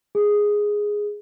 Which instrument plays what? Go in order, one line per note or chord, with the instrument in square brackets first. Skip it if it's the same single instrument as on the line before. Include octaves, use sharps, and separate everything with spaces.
[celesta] G#4